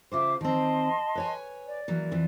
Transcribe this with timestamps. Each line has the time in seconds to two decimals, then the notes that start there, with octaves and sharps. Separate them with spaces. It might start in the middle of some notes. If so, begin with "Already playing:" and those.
0.12 C#3 F4 C5 E5 D6
0.41 D#3 C4 D#5 A5 C6
1.15 B4 C#5 G#5
1.66 D5
1.88 E3 F#3 A#3
2.11 F2 E3 F4